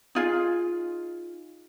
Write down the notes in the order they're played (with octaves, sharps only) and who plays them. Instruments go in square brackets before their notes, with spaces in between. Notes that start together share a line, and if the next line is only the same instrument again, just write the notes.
[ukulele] D#4 F4 G#4